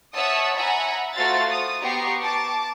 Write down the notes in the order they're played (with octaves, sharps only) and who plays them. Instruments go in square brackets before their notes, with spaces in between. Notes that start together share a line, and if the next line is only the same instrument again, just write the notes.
[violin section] C#5 E5 F#5 A5 D#6 E6
E5 F#5 G#5 A#5 B5
A3 F4 F#4 C5 F5 A6
D#6
B3 G4 A#5 C#6 C7
A5 D6